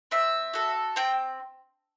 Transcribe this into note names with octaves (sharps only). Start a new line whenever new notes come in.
C4 E5
F#4 A4
C4 G5